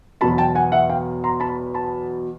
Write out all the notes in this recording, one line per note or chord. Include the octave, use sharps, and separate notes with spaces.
E2 B2 F#3 A5 B5
G5 A5
F#5 G#5
E5 F#5
F5 G5
A#5 C6
A5 B5
A5 B5